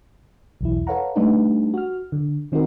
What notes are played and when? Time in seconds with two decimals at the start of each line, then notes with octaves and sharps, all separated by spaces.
0.61 B1 E2 E4
0.87 A4 B4 C#5 F5 F#5 A#5
1.15 G3 A3 D4 D#4 A4 B4
1.74 F#4 F6
2.12 D3
2.52 D#3 C4 D#4 F#4 A#4